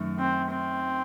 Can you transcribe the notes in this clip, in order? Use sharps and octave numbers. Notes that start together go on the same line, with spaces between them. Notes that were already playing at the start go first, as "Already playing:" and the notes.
Already playing: F#2 D#3 A3
C4
C4